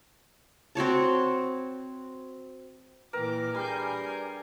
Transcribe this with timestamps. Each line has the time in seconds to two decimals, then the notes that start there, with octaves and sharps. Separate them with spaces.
0.75 C4 F#4 C#5 A5
3.13 A#2 E3 A#4 B4 G5 D6
3.55 G3 D4 G#4 A#4 G#5 C6 G6